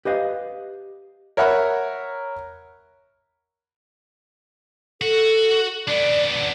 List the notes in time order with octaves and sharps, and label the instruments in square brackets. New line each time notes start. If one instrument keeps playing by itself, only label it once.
[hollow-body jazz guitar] G4 B4 D#5 F5
[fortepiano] A#4 C#5 E5 F#5 A#5 B5
[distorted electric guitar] F#4 [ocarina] A4
[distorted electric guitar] B3 D4 [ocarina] D5